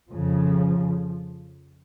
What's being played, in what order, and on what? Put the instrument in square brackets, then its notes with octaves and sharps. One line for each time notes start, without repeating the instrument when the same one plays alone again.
[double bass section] F2 C#3 F3